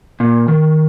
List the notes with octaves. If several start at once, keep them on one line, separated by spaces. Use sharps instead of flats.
A#2
D#3